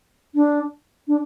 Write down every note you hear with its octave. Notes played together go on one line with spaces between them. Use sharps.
D4
D4